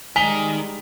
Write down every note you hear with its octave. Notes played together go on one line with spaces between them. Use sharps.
D#3 G3 G#3 G#5 B6 F7 G7